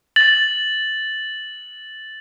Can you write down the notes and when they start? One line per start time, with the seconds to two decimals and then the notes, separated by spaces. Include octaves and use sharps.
0.16 A6 F#7